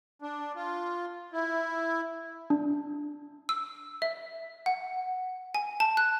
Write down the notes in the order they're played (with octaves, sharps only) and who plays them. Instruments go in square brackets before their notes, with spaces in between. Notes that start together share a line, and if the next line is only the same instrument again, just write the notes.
[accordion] D4
F4
E4
[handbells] D4
[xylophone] E6
E5
F#5
G#5
A5
F#6